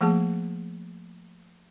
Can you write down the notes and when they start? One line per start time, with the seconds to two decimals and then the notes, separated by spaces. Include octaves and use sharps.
0.01 F3 A3 A#3 G#4 A5